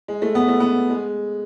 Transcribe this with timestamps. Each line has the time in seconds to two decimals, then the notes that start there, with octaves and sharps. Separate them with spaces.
0.08 G#3
0.22 A3
0.35 B3
0.48 A3
0.60 B3
0.90 G#3